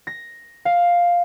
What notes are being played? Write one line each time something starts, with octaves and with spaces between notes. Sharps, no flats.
A#6
F5